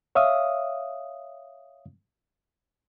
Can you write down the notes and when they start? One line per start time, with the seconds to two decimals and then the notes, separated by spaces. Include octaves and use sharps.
0.15 C#5 E5 F5 D#6